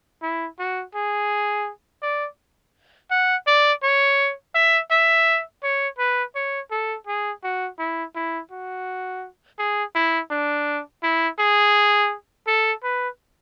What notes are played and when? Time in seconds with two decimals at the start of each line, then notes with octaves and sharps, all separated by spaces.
0.22 E4
0.59 F#4
0.95 G#4
2.02 D5
3.11 F#5
3.47 D5
3.83 C#5
4.55 E5
4.91 E5
5.63 C#5
5.98 B4
6.35 C#5
6.71 A4
7.07 G#4
7.43 F#4
7.79 E4
8.15 E4
8.52 F#4
9.59 G#4
9.95 E4
10.31 D4
11.03 E4
11.39 G#4
12.47 A4
12.83 B4